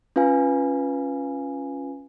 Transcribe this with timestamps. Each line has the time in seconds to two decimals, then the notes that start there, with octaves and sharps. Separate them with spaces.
0.16 C#4 F4 B4 F5 G#5